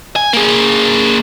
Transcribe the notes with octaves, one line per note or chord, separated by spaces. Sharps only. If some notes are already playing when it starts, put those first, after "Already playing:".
G#5
A#3 G#4